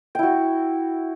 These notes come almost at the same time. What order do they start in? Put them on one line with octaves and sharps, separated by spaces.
G5 E4 F#4